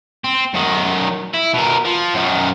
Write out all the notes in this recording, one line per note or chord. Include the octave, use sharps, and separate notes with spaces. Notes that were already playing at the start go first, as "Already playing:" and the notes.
C4
F#2 D#3
E4
B2 A#4
F3
F#2 D#3